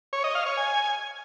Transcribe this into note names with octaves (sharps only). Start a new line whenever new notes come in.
C#5
D#5
F5
C#5
G#5